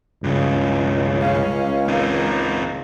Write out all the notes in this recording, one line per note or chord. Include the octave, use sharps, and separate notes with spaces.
C#2 G2 C#3
C#4 F5
A#3 C4 D#4